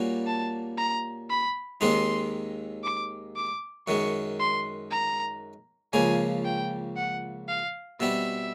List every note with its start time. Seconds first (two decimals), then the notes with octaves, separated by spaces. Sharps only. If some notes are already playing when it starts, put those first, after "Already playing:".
Already playing: A#2 G3 A#3 C#4 F#4
0.26 A5
0.77 A#5
1.29 B5
1.80 D#2 D#3 G#3 C4 D#4 C6
2.84 D6
3.36 D6
3.87 F#2 D#3 G#3 C#6
4.39 C6
4.91 A#5
5.93 C#2 C#3 F3 A#3 G#5
6.45 G5
6.97 F#5
7.48 F5
8.00 B2 G3 C4 E5